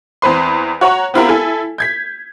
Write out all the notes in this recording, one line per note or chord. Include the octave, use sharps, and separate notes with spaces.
E2 C4 B4 C6
F#4 C#5 F#5 A#5 C#6
B3 C4 E4 F4 G4 A#4
E4 A4 G#5
G6 G#6 B6